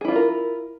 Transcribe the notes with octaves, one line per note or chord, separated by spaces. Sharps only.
D4 E4 F4 G#4 A#4